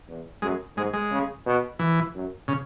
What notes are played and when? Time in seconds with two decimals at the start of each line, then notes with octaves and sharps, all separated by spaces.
0.08 E2
0.42 F#2 G#3
0.77 G#2 G#3
0.93 G#3
1.11 C#3
1.46 B2
1.79 E3
2.15 F#2
2.48 C#3